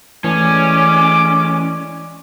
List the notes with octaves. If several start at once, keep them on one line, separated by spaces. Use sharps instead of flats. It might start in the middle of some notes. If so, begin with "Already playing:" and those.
E3 G#3 A3 C#4 D5 D6